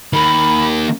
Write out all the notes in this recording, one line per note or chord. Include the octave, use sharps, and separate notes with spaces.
D#3 A#3 B5